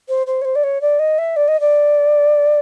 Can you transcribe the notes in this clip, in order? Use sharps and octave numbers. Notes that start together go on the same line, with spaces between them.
C5
C5
C#5
C5
D5
C#5
D5
D#5
E5
D5
D#5
D5